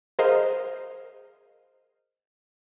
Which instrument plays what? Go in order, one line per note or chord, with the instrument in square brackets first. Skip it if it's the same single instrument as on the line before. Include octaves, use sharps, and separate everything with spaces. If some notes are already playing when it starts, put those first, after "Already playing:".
[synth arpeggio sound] G#4 A#4 C5 D#5 F5